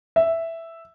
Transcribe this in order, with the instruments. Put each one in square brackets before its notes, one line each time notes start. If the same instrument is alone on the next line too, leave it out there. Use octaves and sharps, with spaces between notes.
[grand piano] E5